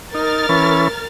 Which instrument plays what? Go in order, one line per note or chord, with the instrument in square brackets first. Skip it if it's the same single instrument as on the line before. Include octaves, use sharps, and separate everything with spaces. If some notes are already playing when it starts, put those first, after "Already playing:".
[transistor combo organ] D#4 [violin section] A#4 F6 A6
[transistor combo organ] E3 C#4 B4